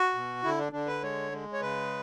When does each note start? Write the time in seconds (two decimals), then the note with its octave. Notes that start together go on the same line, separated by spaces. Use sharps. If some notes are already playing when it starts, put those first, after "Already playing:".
Already playing: F#4
0.15 B2
0.44 D3 E4
0.58 D4
0.72 D3 D4
0.87 B4
1.03 G#3 C#5
1.32 G#3
1.53 C#5
1.61 C#3 B4